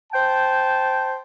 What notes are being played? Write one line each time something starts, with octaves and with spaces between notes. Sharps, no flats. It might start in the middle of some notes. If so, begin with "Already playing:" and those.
C5 G5 A5